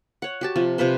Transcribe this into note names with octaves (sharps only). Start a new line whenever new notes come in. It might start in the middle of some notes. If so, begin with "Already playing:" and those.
C#5 F#5
F#4 G4 A5
C3 F3
C3 F3 B4 C5